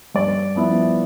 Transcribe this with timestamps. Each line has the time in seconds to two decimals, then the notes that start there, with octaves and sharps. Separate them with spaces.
0.15 G2 D5
0.56 F3 B3 E4